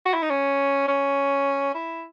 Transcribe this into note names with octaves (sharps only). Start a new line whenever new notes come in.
F#4
E4
D#4
C#4
C#4
E4